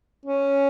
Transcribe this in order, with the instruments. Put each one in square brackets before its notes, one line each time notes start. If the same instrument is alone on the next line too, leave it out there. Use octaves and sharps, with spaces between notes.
[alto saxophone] C#4